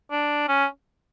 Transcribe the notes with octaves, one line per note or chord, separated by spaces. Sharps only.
D4
C#4